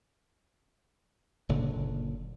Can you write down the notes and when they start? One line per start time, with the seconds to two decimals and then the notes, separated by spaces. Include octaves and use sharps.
1.49 F#1 A#2 D3 F#3